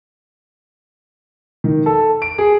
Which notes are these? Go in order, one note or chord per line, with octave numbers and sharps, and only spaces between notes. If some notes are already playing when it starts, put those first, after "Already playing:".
D#3
A4
D7
G#4